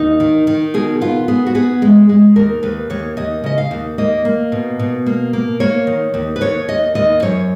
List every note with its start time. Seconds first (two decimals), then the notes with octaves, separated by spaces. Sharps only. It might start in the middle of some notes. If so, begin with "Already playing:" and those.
Already playing: D#2 D#4
0.20 D#3
0.47 D#3
0.74 B2 G#4
1.01 B3 F4
1.28 B3 G#4
1.47 F#4
1.55 B3 G#4
1.82 G#3
2.09 G#3
2.36 D#2 A#4
2.63 D#2 B4
2.90 D#2 C#5
3.17 D#2 D#5
3.44 C#3 D#5
3.58 F5
3.71 D#2
3.98 A#3 D#5
4.25 A#3
4.52 B2
4.79 B2
5.06 A#3
5.33 A#3
5.60 A#3 C#5
5.87 D#3
6.14 D#2
6.36 B4
6.41 D#2 C#5
6.68 D#2 D#5
6.95 D#2 D#5
7.22 F#2 C#5